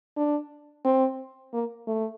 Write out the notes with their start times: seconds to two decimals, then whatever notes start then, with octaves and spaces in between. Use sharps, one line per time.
0.17 D4
0.85 C4
1.53 A#3
1.87 A3